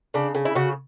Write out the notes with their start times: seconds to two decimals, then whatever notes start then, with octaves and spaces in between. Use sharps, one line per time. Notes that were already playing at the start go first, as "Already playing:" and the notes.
0.14 C#3 D4
0.35 C#3
0.45 E4
0.55 C#3 F#4